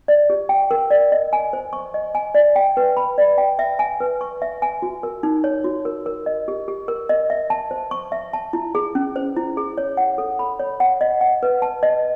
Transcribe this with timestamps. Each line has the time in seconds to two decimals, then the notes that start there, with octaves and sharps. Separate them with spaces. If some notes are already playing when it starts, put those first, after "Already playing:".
0.08 D5
0.30 G4
0.49 G5
0.71 A#4
0.90 D5
1.12 D#5
1.33 G#5
1.53 C5
1.73 C#6
1.94 D#5
2.15 G#5
2.35 D5
2.56 G5
2.77 B4
2.97 B5
3.18 D5
3.38 G5
3.59 E5
3.79 G#5
4.00 B4
4.21 C#6
4.42 E5
4.62 G#5
4.82 F#4
5.03 A#4
5.23 D#4
5.44 C#5
5.64 F#4
5.85 A#4
6.06 A#4
6.26 D#5
6.48 G4
6.68 G4
6.88 A#4
7.09 D#5
7.30 E5
7.50 A5
7.71 C5
7.91 C#6
8.12 E5
8.33 A5
8.53 E4
8.75 G#4
8.95 C#4
9.16 C5
9.37 E4
9.57 G#4
9.78 C#5
9.97 F#5
10.18 A4
10.39 B5
10.59 C#5
10.80 F#5
11.01 D#5
11.21 F#5
11.43 B4
11.62 A5
11.83 D#5